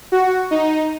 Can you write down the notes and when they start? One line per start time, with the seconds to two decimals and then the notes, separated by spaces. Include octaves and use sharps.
0.12 F#4
0.51 D#4